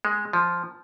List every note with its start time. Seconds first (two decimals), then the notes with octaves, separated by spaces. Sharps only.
0.05 G#3
0.33 F3